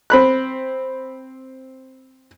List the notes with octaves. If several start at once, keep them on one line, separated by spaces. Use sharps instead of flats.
C4 B5 F#6